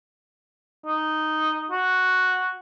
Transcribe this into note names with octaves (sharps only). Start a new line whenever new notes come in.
D#4
F#4